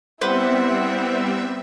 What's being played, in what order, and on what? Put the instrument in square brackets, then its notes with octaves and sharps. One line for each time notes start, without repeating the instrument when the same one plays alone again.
[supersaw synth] G3 C4 [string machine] B3 E5 [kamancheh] E4 F#5 [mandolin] B4 C5